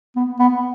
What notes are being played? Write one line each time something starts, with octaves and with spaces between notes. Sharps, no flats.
B3
B3